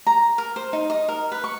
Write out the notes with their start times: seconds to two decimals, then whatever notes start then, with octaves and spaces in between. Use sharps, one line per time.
0.07 A#5
0.38 A#4
0.56 C5
0.73 D#4
0.90 D#5
1.08 A#4
1.32 B4
1.44 C#6